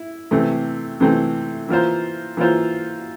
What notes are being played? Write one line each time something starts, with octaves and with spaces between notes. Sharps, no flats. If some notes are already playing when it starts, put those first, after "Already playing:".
Already playing: E4
C3 E3 A3 C4
C3 E3 A3 C4
E3 A#3 F4 C5
E3 A#3 F4 C5